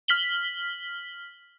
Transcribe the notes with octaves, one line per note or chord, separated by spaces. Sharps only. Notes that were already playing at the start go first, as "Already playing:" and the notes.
F6 B6 F#7 G7